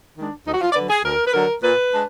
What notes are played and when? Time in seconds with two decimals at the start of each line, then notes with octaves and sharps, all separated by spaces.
0.16 D#3 G#3 D4
0.45 D2 D#4
0.53 F#4
0.60 F4
0.70 D5
0.74 D3 F#3 B4
0.89 G#4
1.04 D2 A#4
1.26 B4
1.33 D3 F#3 A#4
1.62 A#2 B4
1.91 G#3 D4